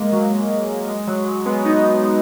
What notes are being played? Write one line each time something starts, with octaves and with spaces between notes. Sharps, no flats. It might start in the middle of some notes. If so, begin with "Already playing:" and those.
Already playing: G#3 A#3
F#3
G#3
F#3
G#3
G#3 B3
B3 D#4
G#3